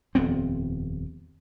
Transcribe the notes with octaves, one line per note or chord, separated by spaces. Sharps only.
D#1 F2 B3 C4